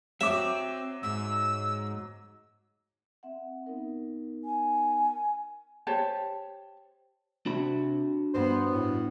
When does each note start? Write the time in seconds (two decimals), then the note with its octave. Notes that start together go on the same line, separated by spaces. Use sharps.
0.21 F#3 C4 E5 D6
1.03 G#2 E6
3.23 C4 E5 F#5
3.66 B3 D#4 A#4
4.45 G#5
5.87 G4 C5 C#5 A5
7.46 C3 D4 F#4 B5
8.34 G2 B3 C5
8.70 A2